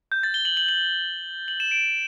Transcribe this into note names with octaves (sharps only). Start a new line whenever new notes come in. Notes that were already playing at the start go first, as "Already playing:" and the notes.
G6
A6
G7
F#7
F#7
F#7
F#7
E7
D7